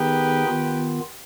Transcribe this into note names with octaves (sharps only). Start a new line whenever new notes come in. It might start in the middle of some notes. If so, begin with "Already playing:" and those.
Already playing: D#3 B3 D#4 G4 G#4 B4
D#3 B3 F4